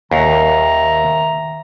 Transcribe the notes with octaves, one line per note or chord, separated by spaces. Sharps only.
D#2 D#3 E5 A#5